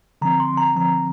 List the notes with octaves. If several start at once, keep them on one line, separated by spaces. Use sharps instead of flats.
D3 F3 C4 A#5
C6
A#5
D3 F3 C4 A#5